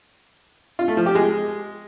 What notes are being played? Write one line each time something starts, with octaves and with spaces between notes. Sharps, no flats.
F4
A3
F3
G4
G#3